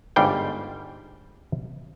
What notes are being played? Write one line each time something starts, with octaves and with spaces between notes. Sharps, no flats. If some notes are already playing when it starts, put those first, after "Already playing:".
G1 G#2 G3 F5 G5